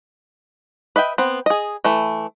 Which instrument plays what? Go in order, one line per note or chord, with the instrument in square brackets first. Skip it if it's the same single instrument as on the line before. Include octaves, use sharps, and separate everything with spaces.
[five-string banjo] B4 D#5 E5 G5
B3 C4
G#4 D#5
E3 A3